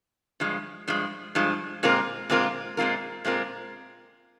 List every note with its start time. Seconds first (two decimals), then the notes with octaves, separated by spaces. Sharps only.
0.40 G2 F3 G#3
0.88 G2 F3 G#3
1.35 G2 F3 G#3
1.83 A#2 G#3 C4 F4 A#4
2.30 A#2 G#3 C4 F4 A#4
2.77 A#2 G#3 C4 F4 A#4
3.25 A#2 G#3 C4 F4 A#4